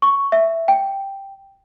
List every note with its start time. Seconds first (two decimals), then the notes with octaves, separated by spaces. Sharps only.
0.02 C#6
0.32 E5
0.68 G5